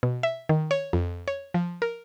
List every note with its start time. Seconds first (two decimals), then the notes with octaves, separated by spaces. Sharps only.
0.03 B2
0.23 E5
0.49 D#3
0.71 C#5
0.93 F2
1.28 C#5
1.54 F3
1.82 A#4